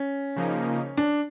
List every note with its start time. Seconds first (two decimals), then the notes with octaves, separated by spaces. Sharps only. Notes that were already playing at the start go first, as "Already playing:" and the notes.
Already playing: C#4
0.36 C#3 F3 A#3 D#4
0.97 D4